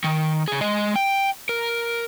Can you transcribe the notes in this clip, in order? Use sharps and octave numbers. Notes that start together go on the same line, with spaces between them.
D#3
C#3 G#4
G#3 D#5
G5
A#4